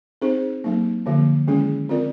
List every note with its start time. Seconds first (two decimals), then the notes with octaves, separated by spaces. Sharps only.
0.21 C4 D#4 G#4 C5
0.64 F#3 A#3 D#4
1.06 D3 F3 A#3
1.48 D#3 G#3 C#4 E4 G#4
1.89 C4 F4 A#4 D5